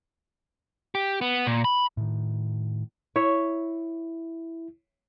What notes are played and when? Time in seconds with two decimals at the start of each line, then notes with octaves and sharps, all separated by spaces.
0.95 G4
1.21 B3
1.47 A#2
1.64 B5
1.97 A2 D#3
3.16 E4 C#5 E5